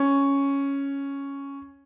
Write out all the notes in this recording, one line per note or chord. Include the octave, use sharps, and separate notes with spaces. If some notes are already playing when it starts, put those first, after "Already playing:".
Already playing: C#4